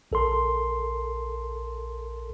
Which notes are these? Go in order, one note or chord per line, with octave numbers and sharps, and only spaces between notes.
A#1 A4 A#4 C6